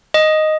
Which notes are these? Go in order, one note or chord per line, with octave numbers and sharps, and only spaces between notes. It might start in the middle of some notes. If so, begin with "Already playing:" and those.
D#5